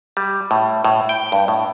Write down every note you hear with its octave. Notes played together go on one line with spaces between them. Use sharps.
G3
A2
A2
G5
G2
A2